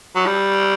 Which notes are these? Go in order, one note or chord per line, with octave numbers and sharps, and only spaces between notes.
F#3
G3